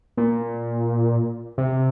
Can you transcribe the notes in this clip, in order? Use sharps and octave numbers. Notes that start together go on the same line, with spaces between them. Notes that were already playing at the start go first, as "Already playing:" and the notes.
A#2
C3